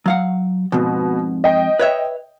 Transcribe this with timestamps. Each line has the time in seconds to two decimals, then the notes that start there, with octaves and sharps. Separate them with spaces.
0.06 F#3 F5 F#5
0.72 F2 G#2 B2
1.44 D#5 G5
1.79 B4 C#5 E5